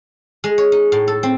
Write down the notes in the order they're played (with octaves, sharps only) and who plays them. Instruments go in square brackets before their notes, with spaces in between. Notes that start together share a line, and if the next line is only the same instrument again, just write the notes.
[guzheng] G#3
C#5
D#4
A2
A4
C4